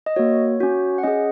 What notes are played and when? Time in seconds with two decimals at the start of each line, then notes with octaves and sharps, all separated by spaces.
0.06 D#5
0.16 A#3 F#4 C#5
0.60 C#4 F#4
0.98 F#5
1.03 C#4 G#4 D#5